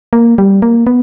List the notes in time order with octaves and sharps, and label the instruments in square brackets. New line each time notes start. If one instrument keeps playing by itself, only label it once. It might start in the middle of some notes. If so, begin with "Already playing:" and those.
[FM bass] A#3
G3
A#3
B3